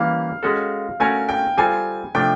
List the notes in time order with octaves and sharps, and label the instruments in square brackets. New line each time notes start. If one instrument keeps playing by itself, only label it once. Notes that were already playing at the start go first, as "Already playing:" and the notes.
Already playing: [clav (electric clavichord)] E3 G3 A#3 C#4 [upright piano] F5
[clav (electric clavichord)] G#3 C#4 F#4 A4
[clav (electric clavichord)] A3 C#4 F#4 A#4 C#5 [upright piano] G#5
[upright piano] G5
[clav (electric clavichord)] G3 C4 F4 A4 [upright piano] G#5
[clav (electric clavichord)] C3 F3 A3 D4 [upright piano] G5